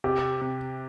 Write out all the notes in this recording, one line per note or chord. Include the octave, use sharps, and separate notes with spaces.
C3 G4
C3